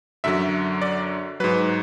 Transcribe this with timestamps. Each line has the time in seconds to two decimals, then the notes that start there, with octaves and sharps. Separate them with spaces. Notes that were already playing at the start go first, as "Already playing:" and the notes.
0.24 F#2 D3 F#3 E5
0.82 D5
1.40 G#2 F#3 B4